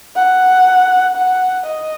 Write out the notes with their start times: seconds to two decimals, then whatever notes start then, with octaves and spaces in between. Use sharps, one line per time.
0.15 F#5
1.17 F#5
1.66 D#5